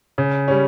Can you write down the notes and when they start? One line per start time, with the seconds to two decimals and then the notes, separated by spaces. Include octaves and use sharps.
0.18 C#3
0.48 G3 C#4